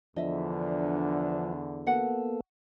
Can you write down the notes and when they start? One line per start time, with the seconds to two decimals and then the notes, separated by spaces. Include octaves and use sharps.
0.17 E2 D3 F3 D4 D#5 E5
1.87 A#3 B3 F#4 A4 F#5